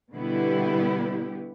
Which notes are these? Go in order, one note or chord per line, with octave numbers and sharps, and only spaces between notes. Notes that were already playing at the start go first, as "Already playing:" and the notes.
B2 D3 G3 B3 E4 G4